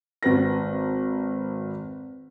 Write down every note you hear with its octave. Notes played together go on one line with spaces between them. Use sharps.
G#1 B4 A#6